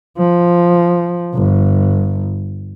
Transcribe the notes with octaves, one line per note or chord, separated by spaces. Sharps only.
F3
G1